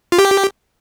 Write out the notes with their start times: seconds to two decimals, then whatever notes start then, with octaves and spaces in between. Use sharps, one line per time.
0.12 F4
0.19 G4